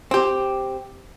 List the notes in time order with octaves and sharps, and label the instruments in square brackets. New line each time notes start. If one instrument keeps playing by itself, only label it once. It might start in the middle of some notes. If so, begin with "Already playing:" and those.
[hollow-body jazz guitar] C4 G4